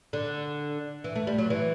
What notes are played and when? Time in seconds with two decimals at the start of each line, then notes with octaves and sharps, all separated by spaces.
0.13 D3
1.04 E3
1.16 A3
1.27 G3
1.38 F#3
1.50 E3